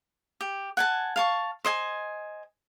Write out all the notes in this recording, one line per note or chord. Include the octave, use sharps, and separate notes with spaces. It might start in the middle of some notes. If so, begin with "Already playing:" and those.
G4
F#5 G#5 A5
F5 A5 C#6
C5 D#5 G#5